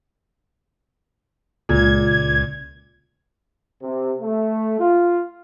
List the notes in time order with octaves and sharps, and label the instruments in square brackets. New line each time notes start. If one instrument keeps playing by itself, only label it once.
[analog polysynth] C#2 G#6 [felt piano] A#2
[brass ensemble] C3
A3
F4